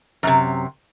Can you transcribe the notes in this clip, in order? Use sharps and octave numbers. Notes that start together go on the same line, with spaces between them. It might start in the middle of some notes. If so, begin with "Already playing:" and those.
F#2 A2 C3